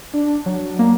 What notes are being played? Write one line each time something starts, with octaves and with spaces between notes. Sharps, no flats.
D4
F#3
A#3